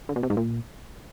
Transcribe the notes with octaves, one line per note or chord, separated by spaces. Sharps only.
D3
B2
C3
G#2
A#2